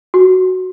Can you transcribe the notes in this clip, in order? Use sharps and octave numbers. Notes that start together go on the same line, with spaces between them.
F#4